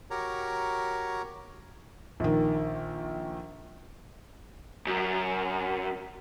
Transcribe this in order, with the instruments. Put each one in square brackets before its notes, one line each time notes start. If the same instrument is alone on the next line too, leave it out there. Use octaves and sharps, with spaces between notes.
[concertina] F#4 G4 A#4 C#5 A#5
[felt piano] A#1 D#3
[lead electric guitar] F#2